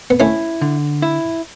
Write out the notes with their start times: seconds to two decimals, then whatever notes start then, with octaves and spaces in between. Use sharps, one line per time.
0.10 B3
0.20 A3 C#4 E4
0.61 D3
1.02 E4